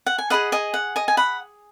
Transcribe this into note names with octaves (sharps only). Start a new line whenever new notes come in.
F#5
G#5
G#4 B4 D#5 F#5 B5
D#5 G#5
F#5
D#5 G#5
G#5
F#5 B5